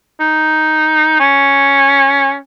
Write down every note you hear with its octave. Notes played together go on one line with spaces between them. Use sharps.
D#4
C#4